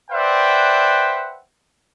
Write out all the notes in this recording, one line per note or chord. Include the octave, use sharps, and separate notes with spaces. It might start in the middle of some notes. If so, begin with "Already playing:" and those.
B4 C5 D5 E5 F#5 G5